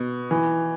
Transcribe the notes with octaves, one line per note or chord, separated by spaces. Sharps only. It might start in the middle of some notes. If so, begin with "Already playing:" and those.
Already playing: B2
E3